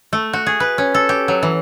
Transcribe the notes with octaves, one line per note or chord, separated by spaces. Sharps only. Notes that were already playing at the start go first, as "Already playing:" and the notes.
A3
F#4
G#4
B4
C#4
A4
G4
F#3
E3